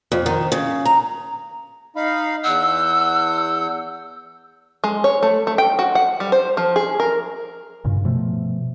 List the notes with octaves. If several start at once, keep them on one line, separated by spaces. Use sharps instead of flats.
F2
D#3
C#3
A#5
D#4 F5 B5
E2 F#5 E6 G6
G#3
C#5
A3
A3
G5
F#4
F#5
G3
C5
F3
G#4
A#4
G2 A#2 C#3
B2 F3 A3